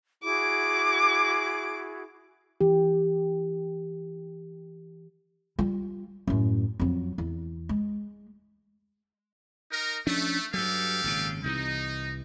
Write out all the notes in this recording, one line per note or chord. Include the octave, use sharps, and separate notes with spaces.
E4 F#4 G#4 D6
E3 G4
G3 F4
F#2 A2
F2 F#3
E2
G#3
D#4 A#4
F3 A3 C#4 D4
G2 F#3 G4 A4 F5
G#1 A#2 C#3
C2 C3 E3 D#4